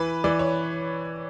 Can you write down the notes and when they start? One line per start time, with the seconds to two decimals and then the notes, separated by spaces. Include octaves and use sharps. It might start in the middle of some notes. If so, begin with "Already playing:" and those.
Already playing: E3 B4
0.24 E3 D5
0.39 C#5